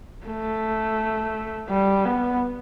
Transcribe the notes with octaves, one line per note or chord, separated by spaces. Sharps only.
A3
G3
B3